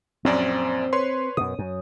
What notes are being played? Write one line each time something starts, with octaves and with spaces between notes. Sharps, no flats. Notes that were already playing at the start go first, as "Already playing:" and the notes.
A#1 F#2 C4 D5
B4 C#5 C6
F#2 B2 D#6
F#2